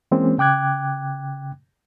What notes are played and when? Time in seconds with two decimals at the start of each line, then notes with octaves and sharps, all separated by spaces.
0.11 E3 G#3 A#3 C4 C#4
0.38 C#3 G5 D6 F#6 G#6